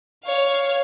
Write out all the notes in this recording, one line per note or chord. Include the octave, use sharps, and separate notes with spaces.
C#5 F5